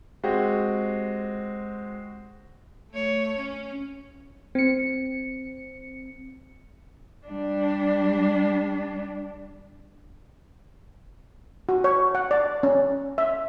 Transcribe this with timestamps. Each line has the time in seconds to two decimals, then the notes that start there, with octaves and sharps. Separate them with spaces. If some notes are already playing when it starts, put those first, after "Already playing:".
0.24 G#3 C4 F#4 G4
2.91 A3 C#5
3.37 C#4
4.55 C4 C#7
7.27 G3 D4
11.69 F#4
11.84 C#5
12.15 F#5
12.31 D5
12.63 C#4
13.18 E5